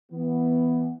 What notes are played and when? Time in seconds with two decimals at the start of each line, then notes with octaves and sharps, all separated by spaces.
0.12 E3 B3